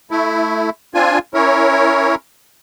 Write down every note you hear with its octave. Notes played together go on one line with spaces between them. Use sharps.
A3 E4
C4 D4 F4 G#5
C#4 E4 A#4 C#5